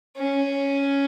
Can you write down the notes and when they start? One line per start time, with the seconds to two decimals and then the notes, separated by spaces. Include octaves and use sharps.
0.17 C#4